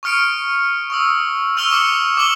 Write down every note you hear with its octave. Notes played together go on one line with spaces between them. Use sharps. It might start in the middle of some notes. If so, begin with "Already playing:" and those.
C#6 D#6 F6 C#7 D7
C#6 D#6 E6
C#6 E6 F6 F7 G7
D6 E6 C#7
D6 F6 E7 F#7 G7